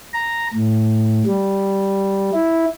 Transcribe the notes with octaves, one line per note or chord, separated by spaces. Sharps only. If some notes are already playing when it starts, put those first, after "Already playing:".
A#5
A2
G3
E4